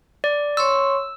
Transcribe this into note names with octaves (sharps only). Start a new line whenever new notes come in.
D5
C#5 C6 C#6 E6